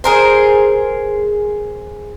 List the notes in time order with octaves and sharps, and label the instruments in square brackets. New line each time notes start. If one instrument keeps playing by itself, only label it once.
[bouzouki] G#4 A#4 C5